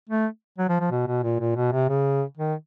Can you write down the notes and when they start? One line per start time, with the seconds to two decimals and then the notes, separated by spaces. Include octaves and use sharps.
0.09 A3
0.58 F#3
0.69 F3
0.80 F3
0.91 B2
1.07 B2
1.23 A#2
1.39 A#2
1.56 B2
1.72 C3
1.89 C#3
2.37 D#3